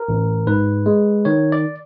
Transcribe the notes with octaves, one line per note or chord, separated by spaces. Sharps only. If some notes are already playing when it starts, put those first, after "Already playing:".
Already playing: A#4
A1
G#2 B4
G#3
D#3 C#5
D5